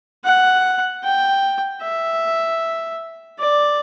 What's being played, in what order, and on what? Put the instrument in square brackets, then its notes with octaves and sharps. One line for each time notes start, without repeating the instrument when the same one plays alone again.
[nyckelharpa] F#5
G5
E5
D5